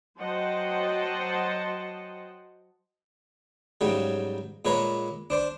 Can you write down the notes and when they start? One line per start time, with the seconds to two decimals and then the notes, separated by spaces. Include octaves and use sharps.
0.18 F#3 C5 D#5 F#5 G5 A5
3.81 G#2 C#3 F#3 G3
4.65 A#2 G#3 B4 C#5 F5 A#5
5.30 D4 C5 D5